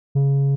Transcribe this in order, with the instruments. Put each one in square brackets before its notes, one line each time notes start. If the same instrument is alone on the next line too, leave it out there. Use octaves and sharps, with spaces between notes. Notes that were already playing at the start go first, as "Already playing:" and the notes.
[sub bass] C#3